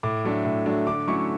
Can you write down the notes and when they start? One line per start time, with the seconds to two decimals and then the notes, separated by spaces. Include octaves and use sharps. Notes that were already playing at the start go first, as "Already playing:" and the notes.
0.03 A2 D6
0.25 F#3 A3 D4
0.45 A2
0.66 F#3 A3 D4
0.87 D3 D6
1.07 F#3 A3 C#4 E4 C#6